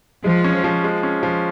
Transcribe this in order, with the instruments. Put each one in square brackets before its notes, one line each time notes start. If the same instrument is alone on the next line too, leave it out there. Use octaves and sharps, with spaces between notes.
[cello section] F3 [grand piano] G#3
[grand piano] C#4
F3
G#3
C#4
F3